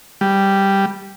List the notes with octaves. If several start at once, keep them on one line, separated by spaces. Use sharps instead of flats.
G3